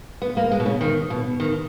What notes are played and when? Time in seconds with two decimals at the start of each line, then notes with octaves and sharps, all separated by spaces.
0.22 B3
0.37 A#3
0.52 G#3
0.60 B2
0.66 C#3
0.81 D#3
1.10 B2
1.40 D#3